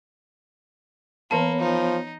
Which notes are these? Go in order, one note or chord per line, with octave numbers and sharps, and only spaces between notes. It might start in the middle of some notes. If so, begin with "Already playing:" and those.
E3 A#3 B3 A#4 C#5 A5
F3 D#4